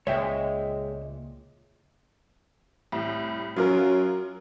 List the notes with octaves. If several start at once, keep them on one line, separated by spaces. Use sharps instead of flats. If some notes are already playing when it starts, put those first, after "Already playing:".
C#2 A#2 G#3 C#5 E5 G5
C2 A2
F#2 F#3 F4 A#4